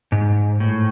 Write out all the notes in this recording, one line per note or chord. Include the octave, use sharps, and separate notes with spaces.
G#2
A2